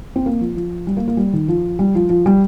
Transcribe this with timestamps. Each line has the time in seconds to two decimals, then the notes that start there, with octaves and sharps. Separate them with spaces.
0.16 C4
0.26 A#3
0.41 F3
0.56 F3
0.87 G3
0.97 A#3
1.08 A#3
1.17 G3
1.33 D#3
1.48 F3
1.79 G3
1.95 F3
2.09 F3
2.26 G3